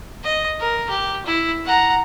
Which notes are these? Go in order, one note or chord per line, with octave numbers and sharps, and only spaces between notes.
D#5
A#4
G4
E4
F#5 A#5